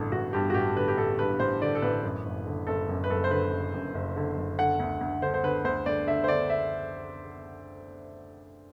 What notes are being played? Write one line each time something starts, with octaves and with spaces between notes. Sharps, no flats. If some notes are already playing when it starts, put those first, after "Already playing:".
Already playing: A1 G2 D3 A4
A1 F#4
G2 G4
F#4
A1 G4
D3 B4
G4
A1 A4
G2 B4
A1 C5
D3 D5
A4
A1 B4
F#2
F#1
D3
F#1 A4
F#2
B4
F#1 A4
C5
D3 B4
F#1
F#2
F#1
D3
F#1
D3 F#5
D2
D2
D3 C5
C5
D3 B4
D2 C5
D2 D5
D3 E5
C5
D3 D5
E5